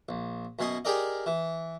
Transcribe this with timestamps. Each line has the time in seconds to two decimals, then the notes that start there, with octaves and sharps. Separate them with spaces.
0.09 A#1
0.59 F#2 B2 G#5 C6 D#6
0.85 G4 G#4 A#4 D5 D#5
1.26 E3